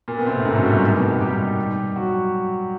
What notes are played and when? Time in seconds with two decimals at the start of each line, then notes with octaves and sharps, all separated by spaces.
0.08 A#2 A#3
0.17 B2 B3
0.26 C3 C4
0.36 A2 A3
0.45 G#2 G#3
0.55 F#2 F#3
0.64 G2 G3
0.83 A#2 A#3
0.96 B2 B3
1.08 D#3 D#4
1.20 G3 G4
1.96 F#3 F#4